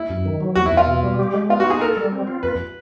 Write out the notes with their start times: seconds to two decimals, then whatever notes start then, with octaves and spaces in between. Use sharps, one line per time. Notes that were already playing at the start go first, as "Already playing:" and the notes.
Already playing: E4
0.10 F#2
0.25 D#3
0.41 F#3
0.55 E2 F#4
0.66 E4
0.72 E2
0.77 F4
0.87 B2
1.03 G3
1.19 G4
1.34 G#3
1.49 B3 F4
1.60 F#4
1.65 D#4
1.70 G#4
1.81 A4 A#4
1.97 G3
2.12 C4
2.27 F4
2.43 F2 B4